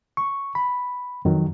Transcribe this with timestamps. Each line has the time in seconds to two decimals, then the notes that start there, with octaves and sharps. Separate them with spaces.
0.17 C#6
0.55 B5
1.25 F2 D#3 F#3